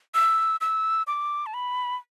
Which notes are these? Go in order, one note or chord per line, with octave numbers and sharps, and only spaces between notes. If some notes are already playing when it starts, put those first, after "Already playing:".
E6
E6
D6
A5
B5